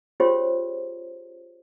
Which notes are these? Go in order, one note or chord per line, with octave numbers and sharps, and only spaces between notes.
C#4 F4 G4 G#4 C5 C#5